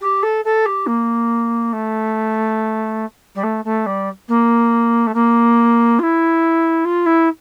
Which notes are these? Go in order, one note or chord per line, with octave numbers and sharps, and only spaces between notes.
G4
A4
A4
G4
A#3
A3
G3
A3
A3
G3
A#3
A3
A#3
F4
E4
F4
E4